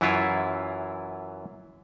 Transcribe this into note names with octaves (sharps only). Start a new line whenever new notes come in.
F#2 E3 F#3 E4 F4